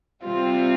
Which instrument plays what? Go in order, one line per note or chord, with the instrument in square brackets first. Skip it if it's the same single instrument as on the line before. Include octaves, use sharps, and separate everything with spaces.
[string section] C3 G3 C4 [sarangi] F4